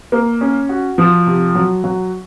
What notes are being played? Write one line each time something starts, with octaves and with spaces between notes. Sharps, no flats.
A#3
C#4
F#4
F3
C3
F#3
F#3